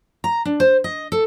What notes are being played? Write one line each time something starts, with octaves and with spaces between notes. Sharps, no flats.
A#5
D4
C5
D#5
A4